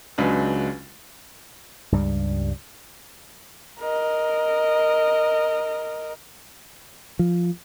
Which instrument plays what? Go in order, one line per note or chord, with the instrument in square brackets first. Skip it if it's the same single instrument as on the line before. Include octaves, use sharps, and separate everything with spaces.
[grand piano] C#2 C#3 F#3 G#3 D4 B4
[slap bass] C#2 G2 G3
[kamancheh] A#4 D#5
[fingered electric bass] F3